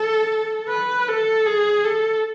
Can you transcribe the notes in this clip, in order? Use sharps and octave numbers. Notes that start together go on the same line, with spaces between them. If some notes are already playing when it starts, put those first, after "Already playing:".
Already playing: A4
B4
A4
G#4
A4